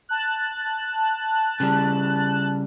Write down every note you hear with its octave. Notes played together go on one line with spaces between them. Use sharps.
A5 F#6
C#3 G3